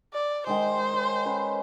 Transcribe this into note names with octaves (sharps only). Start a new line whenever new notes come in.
D5
D#3 G#3 C5
C#5
C#4 B4